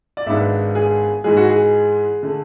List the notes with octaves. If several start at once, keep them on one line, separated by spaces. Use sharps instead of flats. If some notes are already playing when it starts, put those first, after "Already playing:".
D5
G#1 G#2 G#3 B3 D4 E5
G#4
G#2 E3 G#3 G#4
F#4
G#4
D3 A3